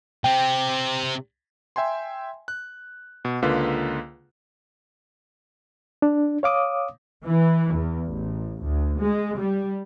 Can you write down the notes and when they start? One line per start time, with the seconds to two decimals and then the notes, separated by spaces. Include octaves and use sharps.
0.24 C3 C4 G5
1.76 E5 G5 G#5 C6
2.48 F#6
3.25 B2
3.42 C#2 D3 A#3 F4 B4
6.02 D4
6.43 C#5 F5 D6 D#6
7.24 E3
7.74 E2
8.07 A1
8.62 D2
8.99 G#3
9.39 G3